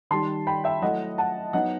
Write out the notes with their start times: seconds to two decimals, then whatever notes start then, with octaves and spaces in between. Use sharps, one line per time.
0.11 D#3 G3 D#4 A5 C6
0.47 G5 B5
0.64 E5 G5
0.82 F#3 A3 E4 D#5 F#5
1.18 F#5 A5
1.53 F#3 B3 D#4 D#5 F#5